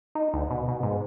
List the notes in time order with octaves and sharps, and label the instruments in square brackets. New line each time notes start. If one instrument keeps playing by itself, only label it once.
[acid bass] D#4
D2
B2
B2
G#2